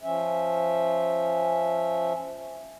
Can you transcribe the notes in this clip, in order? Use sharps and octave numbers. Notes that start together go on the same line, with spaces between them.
F3 C#4 E5